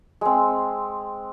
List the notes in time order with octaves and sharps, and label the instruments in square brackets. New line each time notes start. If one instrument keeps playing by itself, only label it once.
[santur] G#3 C4